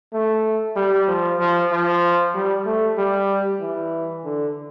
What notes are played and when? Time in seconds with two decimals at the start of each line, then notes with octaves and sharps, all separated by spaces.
0.13 A3
0.77 G3
1.08 F3
1.39 F3
1.72 F3
2.35 G3
2.66 A3
2.98 G3
3.61 E3
4.25 D3